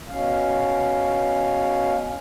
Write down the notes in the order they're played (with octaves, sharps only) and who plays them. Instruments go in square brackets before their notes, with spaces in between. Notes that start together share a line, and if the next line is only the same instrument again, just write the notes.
[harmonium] B2 C#4 F5